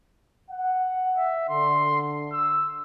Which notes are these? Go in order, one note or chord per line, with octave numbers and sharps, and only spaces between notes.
F#5
E5
D3 C6
E6